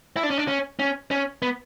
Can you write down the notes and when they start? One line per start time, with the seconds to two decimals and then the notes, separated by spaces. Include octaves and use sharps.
0.17 E4
0.23 D4
0.30 C#4
0.38 D4
0.48 C#4
0.79 C#4
1.11 C#4
1.42 B3